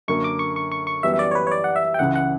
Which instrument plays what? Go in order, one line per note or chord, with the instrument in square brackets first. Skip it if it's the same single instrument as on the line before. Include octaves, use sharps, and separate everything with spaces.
[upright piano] F#2 D3 A#3 [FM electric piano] C#6
[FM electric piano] D6
C#6
C#6
C#6
C#6
[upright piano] F#2 E3 G3 B3 [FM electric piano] E5
[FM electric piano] E5
D5
C#5
B4
C#5
D5
F#5
E5
G5
[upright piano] C#2 C#3 E3 [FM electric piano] F#5
[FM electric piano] F#5